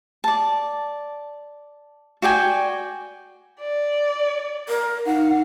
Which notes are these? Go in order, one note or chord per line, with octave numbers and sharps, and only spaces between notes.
D5 A5
F#4 D5 G5 G#5
D5
A#4
D#4 F5 F#5